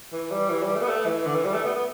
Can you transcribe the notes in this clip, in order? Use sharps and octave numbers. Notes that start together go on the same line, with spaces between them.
E3
G3
E3
G3
A3
B3
A3
E3
D3
E3
G3
A3
B3
B3